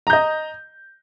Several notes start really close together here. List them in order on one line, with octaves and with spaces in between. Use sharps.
A#5 G6 D#5